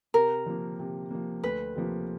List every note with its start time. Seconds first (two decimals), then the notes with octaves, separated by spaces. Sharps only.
0.14 C3 A#4
0.46 F3 A#3
0.79 C3
1.11 F3 A#3
1.43 D2 B4
1.76 C3 F3 A#3